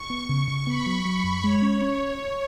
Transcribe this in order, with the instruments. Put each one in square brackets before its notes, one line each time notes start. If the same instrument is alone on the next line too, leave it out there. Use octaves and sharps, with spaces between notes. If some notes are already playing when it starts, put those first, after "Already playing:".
Already playing: [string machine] C#6
[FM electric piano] B3
C#3
C#3
[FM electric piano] B3 [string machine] B5
[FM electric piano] F#3
F#3
F#2
[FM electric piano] G#3 [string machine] C#5
[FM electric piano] C#4
C#4